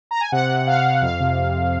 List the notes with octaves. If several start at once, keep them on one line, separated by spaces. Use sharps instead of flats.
A#5
G#5
C3 F#5
C3
C3 F5
C3
F2 F5
C3